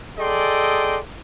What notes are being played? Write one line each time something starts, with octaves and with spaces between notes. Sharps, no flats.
G#4 A4 D5 D#5 G5 C6